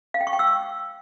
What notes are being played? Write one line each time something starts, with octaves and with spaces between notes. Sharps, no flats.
F5
G5
C#6
G5
E6